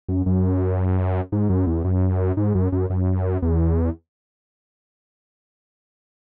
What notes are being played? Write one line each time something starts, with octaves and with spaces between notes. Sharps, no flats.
F#2
F#2
G#2
F#2
E2
F#2
G#2
F#2
F#2
F#2
E2